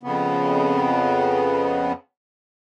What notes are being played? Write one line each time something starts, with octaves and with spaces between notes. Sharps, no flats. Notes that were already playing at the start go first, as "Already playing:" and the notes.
F2 C#3 B3